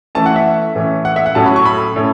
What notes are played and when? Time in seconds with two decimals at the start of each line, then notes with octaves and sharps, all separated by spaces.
0.15 E3 A3 C#4 A5
0.26 F#5
0.36 E5
0.75 A2 E3 C#4
1.05 F#5
1.16 E5
1.26 F#5
1.35 A2 F#3 A3 C#4 A5
1.46 B5
1.56 C#6
1.65 B5
1.96 A2 A3 C#4